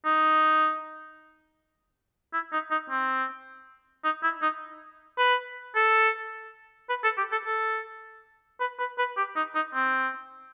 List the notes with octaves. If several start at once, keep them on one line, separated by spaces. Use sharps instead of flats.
D#4
E4
D#4
D#4
C4
D#4
E4
D#4
B4
A4
B4
A4
G4
A4
A4
B4
B4
B4
G4
D#4
D#4
C4